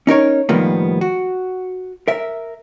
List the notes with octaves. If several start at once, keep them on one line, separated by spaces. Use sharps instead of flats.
C#4 D#4 A#4 C#5
A2 D#3 F3 G3 A#3 B3
F#4
A#4 E5